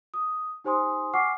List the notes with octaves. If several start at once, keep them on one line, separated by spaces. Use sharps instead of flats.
D#6
D#4 G4 C5 G#5 C6 D#6
F#5 G#5 C#6 D6 F6 C7